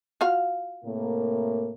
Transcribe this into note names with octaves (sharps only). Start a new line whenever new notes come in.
F4 F#4 F5
A2 C3 A#3